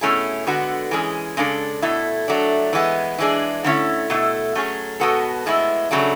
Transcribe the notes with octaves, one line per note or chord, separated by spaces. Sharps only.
B2 A3 C#4 E4 G#4
D3 G#3 B3 F#4
E3 G#3 C#4 G#4
C#3 G#3 D4 A4
B2 A3 E4
F#3 A3 D4
E3 G#3 B3
E3 G#3 D4 G#4
D3 A3 C#4 E4
B2 A3 E4
F#3 A3 C#4 G#4
B2 G#3 B3 F#4 A4
A2 G#3 B3 E4
C#3 F#3 A3 D4